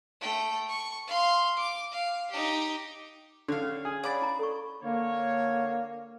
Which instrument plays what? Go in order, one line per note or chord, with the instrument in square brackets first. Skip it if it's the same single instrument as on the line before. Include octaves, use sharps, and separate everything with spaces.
[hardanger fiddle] A3 G5
C#6
F5 C6
D6
F5
D#4 G4
[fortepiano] D3 [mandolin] C#5 F5
[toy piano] C#4
[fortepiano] G#4
[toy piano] C#5 F5 F#5 [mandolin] D5 B5 D6
[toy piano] E4 A#5
A4 C#6
[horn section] D3 C#5 [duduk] A#3